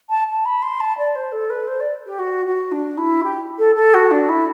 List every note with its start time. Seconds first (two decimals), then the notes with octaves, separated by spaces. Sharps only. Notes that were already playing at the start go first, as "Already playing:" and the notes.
0.10 A5
0.28 A5
0.45 B5
0.62 C6
0.80 A5
0.98 D5
1.15 C5
1.32 A4
1.50 B4
1.67 C5
1.80 D5
2.06 G4
2.19 F#4
2.46 F#4
2.72 D4
2.97 E4
3.23 G4
3.58 A4
3.75 A4
3.94 F#4
4.11 D4
4.29 E4